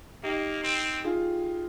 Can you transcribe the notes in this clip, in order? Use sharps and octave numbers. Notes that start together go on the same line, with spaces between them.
A#3 D#4 G4
C4
F4 G#4